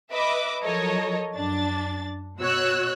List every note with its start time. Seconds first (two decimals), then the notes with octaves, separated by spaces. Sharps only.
0.11 B4 D#5 E5 D6
0.63 F3 F#3 A4 A#4 C#5 D#5
1.34 F#2 D4 A6
2.39 B2 F#4 C#5 E6 F#6